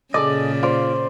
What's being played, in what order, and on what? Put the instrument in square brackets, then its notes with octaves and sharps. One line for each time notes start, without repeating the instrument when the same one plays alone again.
[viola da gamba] A#2 C#3 [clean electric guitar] G#4 A4 D#5 [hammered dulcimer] D5
[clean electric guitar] F4 D5 [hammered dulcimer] C5